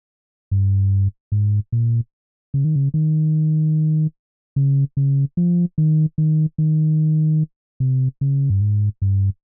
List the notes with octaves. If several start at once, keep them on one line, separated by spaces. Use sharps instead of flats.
G2
G#2
A#2
C#3
D#3
C#3
D#3
C#3
C#3
F3
D#3
D#3
D#3
C3
C#3
G2
G#2
G2